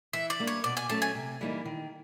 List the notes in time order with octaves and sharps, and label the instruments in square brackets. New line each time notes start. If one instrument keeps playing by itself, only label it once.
[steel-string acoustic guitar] E3 [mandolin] E5
[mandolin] D5
[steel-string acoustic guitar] G3 A#3 D4
[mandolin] C#5
[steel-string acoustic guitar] B2 [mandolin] D5
[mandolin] G#5
[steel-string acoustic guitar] F#3 A3 C#4 [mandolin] A5
[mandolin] G#5
[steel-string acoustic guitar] C3
E3 G3 A#3 D#4
D#3